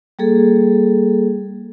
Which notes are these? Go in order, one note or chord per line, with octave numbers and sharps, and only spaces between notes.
G3 A#3 G#4 A4